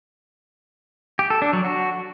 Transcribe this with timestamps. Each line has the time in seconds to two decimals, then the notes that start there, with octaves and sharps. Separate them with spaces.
1.19 G4
1.30 A4
1.42 D4
1.53 F#3
1.64 F#4